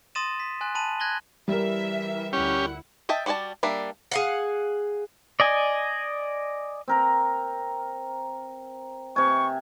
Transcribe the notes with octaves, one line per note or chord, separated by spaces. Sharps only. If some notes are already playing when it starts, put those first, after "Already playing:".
C6 D#6 A6 A#6 D#7 E7
B6
G#5 C6 F#6
A5 B5 D#7 F#7
F#6 G#6 A#6 F#7 G7
E3 G3 A#4 E5
D2 C#4 E4 G4 F#5
D#5 E5 G5 A5
G3 F#4 D5 G#5 A5
G3 A#3 D4 E5
G#4 F5 F#5
D5 D#5 G#5
C4 A#4 A#5
C3 G#5 C#6